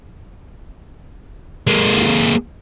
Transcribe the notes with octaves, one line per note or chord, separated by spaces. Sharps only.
G#3 A#3